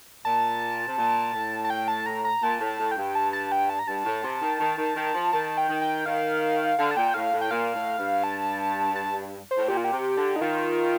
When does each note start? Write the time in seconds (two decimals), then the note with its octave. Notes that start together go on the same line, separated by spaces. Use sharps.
0.25 A#2 A5
0.88 C3
0.98 A#2
1.34 A2
1.64 A5
1.70 G5
1.88 A5
2.06 A#5
2.25 A#5
2.43 A#2 A5
2.61 A2
2.66 A5
2.80 A2
2.91 G5
2.97 G2
3.15 A5
3.33 A5
3.52 G5
3.70 A5
3.79 A#5
3.88 G2 A5
4.05 A2
4.24 C3
4.42 D#3
4.60 D#3
4.78 D#3
4.96 D#3
5.14 F3
5.33 D#3 A5
5.57 G5
5.69 D#3
5.82 G5
6.06 D#3 F5
6.79 D3 F5
6.91 A5
6.97 A#2 G5
7.14 A2 F5
7.33 A2
7.41 G5
7.51 A#2 F5
7.75 A2
7.99 G2
8.24 A5
8.96 A5
9.51 C5
9.57 A2
9.68 A#2 G4
9.77 F4
9.84 G4
9.92 C3
10.17 D3
10.36 D#4
10.41 D#3 F4